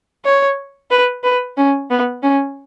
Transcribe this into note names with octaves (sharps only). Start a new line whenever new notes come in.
C#5
B4
B4
C#4
B3
C#4